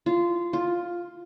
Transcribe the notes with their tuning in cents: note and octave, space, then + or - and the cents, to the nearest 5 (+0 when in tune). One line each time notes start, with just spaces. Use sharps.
F4 -15
F4 +5